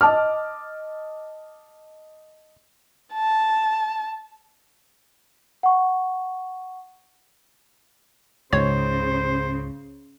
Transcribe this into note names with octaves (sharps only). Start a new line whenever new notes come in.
D#5 A5 D6 F6
A5
F#5 C#6
C#2 G#2 C#3 C5 C#5